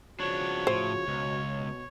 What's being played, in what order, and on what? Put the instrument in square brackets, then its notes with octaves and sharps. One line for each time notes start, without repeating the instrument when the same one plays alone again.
[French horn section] C#3 F3 F#4 [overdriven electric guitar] B3 D4 [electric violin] C#5
[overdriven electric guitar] A2 [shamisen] C5
[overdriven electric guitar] C#2 [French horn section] B2 F#4
[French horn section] B2